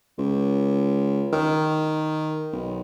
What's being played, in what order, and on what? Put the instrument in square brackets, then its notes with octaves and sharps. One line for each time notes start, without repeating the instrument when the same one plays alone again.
[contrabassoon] C#2
D#3
B1